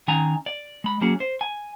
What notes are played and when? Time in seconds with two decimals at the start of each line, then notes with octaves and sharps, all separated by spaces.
0.08 D#3 C#4 G#5 A#5
0.46 D5
0.84 G#3 B5
1.01 F#3 A#3 C#4 F#4 G#4
1.20 C5
1.41 G#5